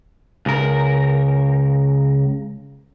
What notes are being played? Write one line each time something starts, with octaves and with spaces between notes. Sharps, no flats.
C#2 A#4